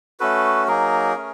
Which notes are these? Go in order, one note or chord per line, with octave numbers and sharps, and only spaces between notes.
A3 C#4 F#4 A4 B4
F#3 A#3 D#4 G#4 A#4
A3 C#4